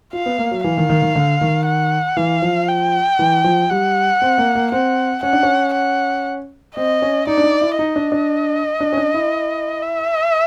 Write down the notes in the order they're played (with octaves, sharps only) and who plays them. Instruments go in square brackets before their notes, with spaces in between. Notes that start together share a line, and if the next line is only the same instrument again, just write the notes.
[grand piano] F4 [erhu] F5
[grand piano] B3
A#3
F#3
[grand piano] E3 [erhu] F5
[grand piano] D#3
D#3
D#3
D3
D#3
[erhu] F#5
[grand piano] E3 [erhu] F5
[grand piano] F3
[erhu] G5
[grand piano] E3
F3
[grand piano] G3 [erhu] F#5
[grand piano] C4
A#3
A#3
[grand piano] C4 [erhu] F#5
[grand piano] C#4 [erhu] F#5
[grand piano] D4
C#4
[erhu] F#5
[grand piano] C4 [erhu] D#5
[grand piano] C#4
[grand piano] D#4 [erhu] D5
[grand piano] D4
D#4
E4
[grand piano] D#4 [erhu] D#5
[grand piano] D4
D4
D4
C#4
D4
E4
[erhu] E5